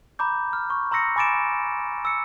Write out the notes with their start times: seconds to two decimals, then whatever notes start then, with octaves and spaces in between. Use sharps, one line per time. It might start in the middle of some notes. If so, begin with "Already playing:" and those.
0.19 A#5 B5 D6 G6
0.53 F6
0.70 C#6
0.91 A#5 C6 E6 A#6 C#7
1.16 G#5 B5 D6 A6 D7 E7
2.05 E6 C#7